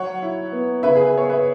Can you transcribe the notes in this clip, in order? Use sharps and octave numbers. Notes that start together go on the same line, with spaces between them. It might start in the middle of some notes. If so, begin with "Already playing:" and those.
Already playing: F#3 C#5 F#5
E4
B3
C#3 B4 E5
G#4
B4
B3 C#5
B4 E5